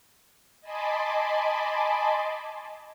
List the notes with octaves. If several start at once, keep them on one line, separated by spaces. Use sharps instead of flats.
D#5 G#5 A5 B5 C6 D6